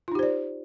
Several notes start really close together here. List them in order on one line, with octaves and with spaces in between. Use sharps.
F4 D#4 G4 C5 D5